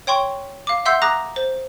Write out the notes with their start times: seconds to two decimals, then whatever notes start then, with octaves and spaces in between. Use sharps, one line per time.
0.07 C#5 G5 C6 C#6
0.67 F5 D6
0.85 E5 F#5 C6 E6 G6 C7
1.02 A#5 D6 D#6 F#6 A#6
1.36 C5